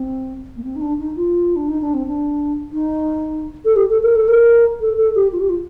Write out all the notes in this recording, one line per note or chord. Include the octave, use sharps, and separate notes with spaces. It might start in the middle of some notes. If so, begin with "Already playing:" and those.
Already playing: C4
A#3
C4
D#4
D4
D#4
F4
D4
D#4
D4
C4
D4
D#4
A4
G4
A4
A#4
A4
A#4
A4
A4
G4
F4
G4
F4